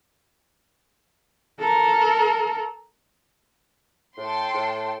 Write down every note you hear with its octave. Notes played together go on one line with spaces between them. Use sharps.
A4 A#4
A2 A4 G5 C6
A2